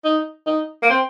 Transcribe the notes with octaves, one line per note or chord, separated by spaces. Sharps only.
D#4
D#4
A#3
C4